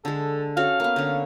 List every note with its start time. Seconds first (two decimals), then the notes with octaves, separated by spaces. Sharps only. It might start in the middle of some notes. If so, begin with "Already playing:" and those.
0.05 D3 G#3 A4
0.57 C#4 F#4 A4 F5
0.80 A#3 B3
0.96 D3 C#4